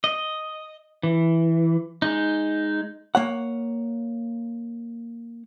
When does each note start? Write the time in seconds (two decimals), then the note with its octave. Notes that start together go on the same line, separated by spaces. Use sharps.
0.04 D#5
1.03 E3
2.02 G#3 D#4
3.15 A#3 C#5 F#5